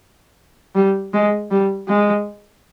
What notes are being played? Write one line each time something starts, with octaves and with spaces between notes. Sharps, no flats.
G3
G#3
G3
G#3